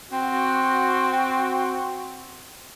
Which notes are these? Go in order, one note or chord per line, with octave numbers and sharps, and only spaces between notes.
C4 F#4